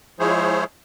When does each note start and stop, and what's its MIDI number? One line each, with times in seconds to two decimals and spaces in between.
0.19 0.64 53
0.19 0.64 56
0.19 0.64 64
0.19 0.64 68
0.19 0.64 72
0.19 0.64 73